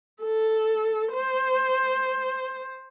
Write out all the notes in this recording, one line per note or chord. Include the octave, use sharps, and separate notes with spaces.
A4
C5